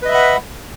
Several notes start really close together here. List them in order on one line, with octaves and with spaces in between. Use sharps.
B4 D#5 E5 B5 F#5